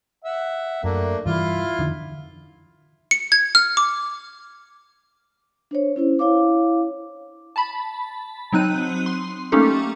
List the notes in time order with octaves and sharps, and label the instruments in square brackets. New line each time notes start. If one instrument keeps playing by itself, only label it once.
[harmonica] E5 F#5
[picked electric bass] F#2 [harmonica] A3 A#3 D4
[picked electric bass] G2 E3 G3 [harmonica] E4 F4 F5
[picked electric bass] F2 D3 D#3
[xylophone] C#7
G#6
F6
D6
[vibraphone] D4 C5 C#5
C#4 E4 C5
E4 C#5 F5 D6
[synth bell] A5 B5
F#3 C4 D#4 F#6 D#7
C6
A3 A#3 C#4 D#4 G4 A4